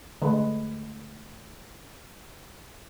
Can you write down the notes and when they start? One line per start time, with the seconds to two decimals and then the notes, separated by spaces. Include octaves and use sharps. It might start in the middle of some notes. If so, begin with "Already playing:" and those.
0.22 D3 G#3 A3 B4